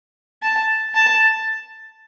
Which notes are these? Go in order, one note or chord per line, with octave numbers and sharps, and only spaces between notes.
A5
A5